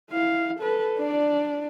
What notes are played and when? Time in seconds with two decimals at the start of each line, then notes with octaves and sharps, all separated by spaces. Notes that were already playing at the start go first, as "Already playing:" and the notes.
0.11 E4 F5
0.60 A4 B4
0.98 D4 D5